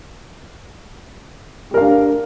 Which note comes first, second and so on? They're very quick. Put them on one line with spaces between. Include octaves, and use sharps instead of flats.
G4 A#4 F5 D4